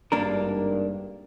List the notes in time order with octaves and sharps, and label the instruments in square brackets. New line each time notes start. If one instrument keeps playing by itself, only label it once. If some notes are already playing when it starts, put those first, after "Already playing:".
[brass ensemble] G#1 G2 [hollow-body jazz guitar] A#3 D4 A#4